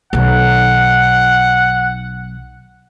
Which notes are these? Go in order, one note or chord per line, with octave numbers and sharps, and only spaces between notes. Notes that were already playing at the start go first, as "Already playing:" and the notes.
B1 D#3 F#5